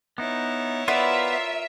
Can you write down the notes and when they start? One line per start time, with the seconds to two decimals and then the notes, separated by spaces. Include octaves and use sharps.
0.18 B3 D#4 E4 C#5
0.88 B3 F4 A#4 B4 D5 E5